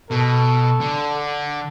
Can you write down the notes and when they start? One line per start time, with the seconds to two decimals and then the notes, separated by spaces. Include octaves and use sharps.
0.11 B2 A4
0.81 D3